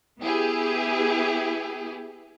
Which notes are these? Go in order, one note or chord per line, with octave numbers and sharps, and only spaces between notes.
B3 E4 G4 G#4